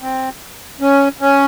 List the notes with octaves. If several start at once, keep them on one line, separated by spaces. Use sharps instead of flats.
C4
C#4
C#4